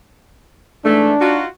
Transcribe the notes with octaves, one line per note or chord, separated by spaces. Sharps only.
G#2 E3 A3 D4
D#4 F4 F#4